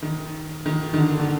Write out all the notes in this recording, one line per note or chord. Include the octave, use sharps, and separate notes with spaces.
D#3
D#3
D#3
D3
D3